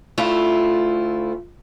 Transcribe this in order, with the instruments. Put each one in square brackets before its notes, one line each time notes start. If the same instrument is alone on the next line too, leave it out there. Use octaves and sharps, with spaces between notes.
[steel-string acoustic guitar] D2 A3 E4 F4